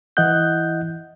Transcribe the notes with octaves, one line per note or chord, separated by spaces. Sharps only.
E3 E4 D#5 F#5 F#6 G6